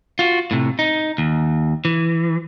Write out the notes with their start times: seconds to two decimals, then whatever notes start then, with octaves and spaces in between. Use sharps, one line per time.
0.19 F4 F#4
0.51 A2 C3
0.79 D#4
1.18 D#2
1.85 E3